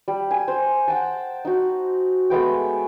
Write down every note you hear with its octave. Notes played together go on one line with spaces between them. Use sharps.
G3
G#5
C5
F#5 G5 A5
D#4 F#4
G#3 A3 B3 G5